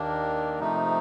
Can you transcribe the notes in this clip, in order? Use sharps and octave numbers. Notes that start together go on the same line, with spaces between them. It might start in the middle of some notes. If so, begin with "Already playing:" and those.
Already playing: D#2 D#3 A#3 D4
C3 F3 A3 D#4